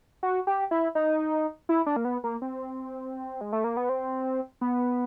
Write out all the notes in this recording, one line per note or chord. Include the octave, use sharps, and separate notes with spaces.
F#4
G4
E4
D#4
E4
D4
A#3
B3
A#3
C4
G#3
A3
A#3
B3
C4
B3